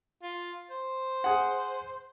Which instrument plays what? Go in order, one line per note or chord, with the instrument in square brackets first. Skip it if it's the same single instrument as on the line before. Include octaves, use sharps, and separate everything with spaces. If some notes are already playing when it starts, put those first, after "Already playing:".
[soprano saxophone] F4
C5
[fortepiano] G#4 F#5